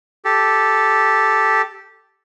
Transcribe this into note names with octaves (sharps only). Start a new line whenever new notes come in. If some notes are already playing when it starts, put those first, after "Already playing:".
G4 A4